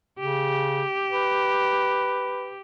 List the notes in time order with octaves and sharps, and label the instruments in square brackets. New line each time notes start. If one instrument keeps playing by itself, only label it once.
[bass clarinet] C#3 [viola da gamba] G4
[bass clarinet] B4